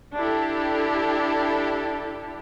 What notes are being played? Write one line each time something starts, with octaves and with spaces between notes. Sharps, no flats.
D4 E4 G4 A4